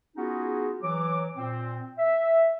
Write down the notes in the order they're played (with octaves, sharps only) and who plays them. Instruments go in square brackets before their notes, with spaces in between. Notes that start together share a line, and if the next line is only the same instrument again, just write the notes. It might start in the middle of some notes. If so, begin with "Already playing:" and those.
[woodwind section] B3 C#4 D#4 F4 F#4 G#4
E3 F#3 D6
A#2 C4
E5